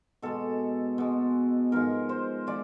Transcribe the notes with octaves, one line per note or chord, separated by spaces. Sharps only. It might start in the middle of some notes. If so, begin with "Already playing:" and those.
B2 G#3 A4
B2 G#3
G#2 F3 G#3 A#4
C5
F3 G#3 D5